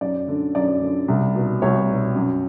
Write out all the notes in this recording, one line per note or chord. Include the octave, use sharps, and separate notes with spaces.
F#2 D5
D3
F#2 D5
D3
C2
B2
C2 C#5
B2
F#2